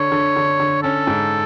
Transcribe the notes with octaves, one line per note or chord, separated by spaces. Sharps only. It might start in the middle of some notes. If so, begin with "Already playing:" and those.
Already playing: D3 C#5
D3
D3
D3
C#4 A4
G#2